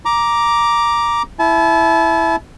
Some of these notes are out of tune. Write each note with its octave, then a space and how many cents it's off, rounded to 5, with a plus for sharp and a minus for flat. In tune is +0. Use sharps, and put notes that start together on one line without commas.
A#5 +10 D6 +0
E4 +0 A5 -40